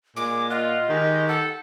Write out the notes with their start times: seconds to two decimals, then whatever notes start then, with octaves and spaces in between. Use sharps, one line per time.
0.17 A#2 G#3 D6
0.50 F4 D#5 F#5
0.89 D#3 G#3 G4
1.28 A4 F#5